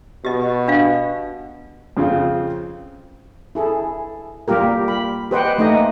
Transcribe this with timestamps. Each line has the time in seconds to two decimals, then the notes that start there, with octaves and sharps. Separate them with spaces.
0.25 B2 G4 D#5
0.68 D4 F5
1.97 F2 C#3 C4 F4
3.55 E4 G#4 A4
4.48 G3 A#3 F4 G4 A#4
4.88 B5
5.31 G4 B4 C5 D#5 F#5 G5
5.58 A3 A#3 D#4 D#5